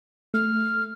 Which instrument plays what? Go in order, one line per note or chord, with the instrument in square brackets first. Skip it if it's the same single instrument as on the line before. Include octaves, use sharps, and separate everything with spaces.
[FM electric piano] A3 [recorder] F6